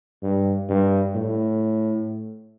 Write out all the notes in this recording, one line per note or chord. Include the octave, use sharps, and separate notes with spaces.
G2
G2
A2